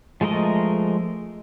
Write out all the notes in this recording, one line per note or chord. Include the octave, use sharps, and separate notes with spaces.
F3 G#3 A3 A#4 D#5